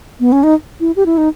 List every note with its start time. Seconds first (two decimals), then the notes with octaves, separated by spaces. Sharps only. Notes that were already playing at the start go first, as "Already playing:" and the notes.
0.20 B3
0.32 C#4
0.43 D#4
0.80 E4
0.96 G4
1.06 E4
1.18 D#4